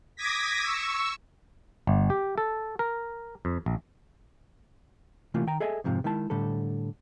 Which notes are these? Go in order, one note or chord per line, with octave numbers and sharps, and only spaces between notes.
D6 D#6 G#6 A#6 B6
C#6 E6
G1
G4
A4
A#4
F2
A#1
C3 E3 A3 A#3 F4
D#3 G5 A#5
G#4 A4 D#5 E5 G#5
F2 G#2 C3 F3
D#3 G#3 E4 A5
A2 D3 G3 A4